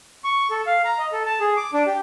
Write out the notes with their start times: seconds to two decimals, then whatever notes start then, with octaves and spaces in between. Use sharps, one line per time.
0.24 C#6
0.50 A4
0.66 F5
0.85 A#5
0.99 D#5
1.12 A4
1.26 A5
1.40 G#4
1.57 D6
1.73 D4
1.86 G4